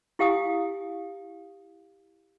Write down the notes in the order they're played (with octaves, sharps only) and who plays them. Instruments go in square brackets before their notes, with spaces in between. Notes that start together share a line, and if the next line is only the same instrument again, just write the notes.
[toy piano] E4 G4 F5 G#5 D#6